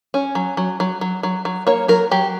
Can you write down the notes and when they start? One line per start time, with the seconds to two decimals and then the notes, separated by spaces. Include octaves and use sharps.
0.14 C#4
0.35 F#3
0.57 F#3
0.80 F#3
1.01 F#3
1.23 F#3
1.45 F#3
1.67 A#3 C#5
1.88 F#3 A#4
2.11 F#3 G4